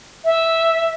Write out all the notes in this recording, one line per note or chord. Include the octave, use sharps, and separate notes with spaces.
E5